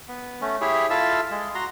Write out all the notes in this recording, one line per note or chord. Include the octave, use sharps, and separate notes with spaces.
B3
A3 C#4
E4 G4 G#4 C#5 E5
E4 F4 A4 E5 F5 E6
G#3
F#4 A#5 C6